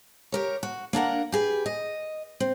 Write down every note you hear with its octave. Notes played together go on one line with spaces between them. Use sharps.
G4 A#4 C#5
F#4
A#3 D4 A#4 F#5
G4 G#4 B4
D#5
C4